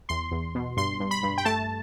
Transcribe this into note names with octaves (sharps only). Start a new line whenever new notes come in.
E2 C6
E2
B2
G2 C6
G2
B5
G2
G5
A3 A5